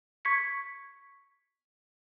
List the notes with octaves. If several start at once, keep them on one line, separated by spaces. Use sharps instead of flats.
C#6 G#6 B6 C#7